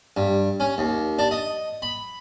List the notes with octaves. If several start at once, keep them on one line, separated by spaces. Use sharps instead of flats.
G2
C#4
D#2
D4
D#5
B5